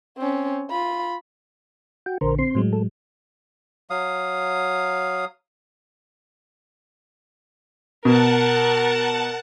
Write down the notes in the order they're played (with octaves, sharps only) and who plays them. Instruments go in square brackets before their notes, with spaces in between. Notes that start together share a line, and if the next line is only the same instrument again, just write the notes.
[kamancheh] C4 C#4
F4 B5
[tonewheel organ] F#4 G5
[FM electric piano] A#1 D3 [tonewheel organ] A#4 C5
[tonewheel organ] C4 C6
[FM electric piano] A2 F#3 G#3
[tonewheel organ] A4
[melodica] F#3 F5 D#6
[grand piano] B2 [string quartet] A#4 [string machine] F#5 A5